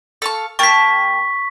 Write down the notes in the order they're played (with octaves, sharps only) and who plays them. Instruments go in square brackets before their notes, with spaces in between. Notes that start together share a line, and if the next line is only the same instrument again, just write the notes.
[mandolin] A4 F5 C#6
[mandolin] A#3 G4 A5 [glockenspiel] C#6 B6